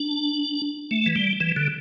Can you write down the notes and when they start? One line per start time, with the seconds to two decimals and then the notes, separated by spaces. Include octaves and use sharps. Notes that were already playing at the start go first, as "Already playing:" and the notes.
Already playing: D4
0.91 A3
1.06 E3
1.16 G3
1.40 E3
1.56 D3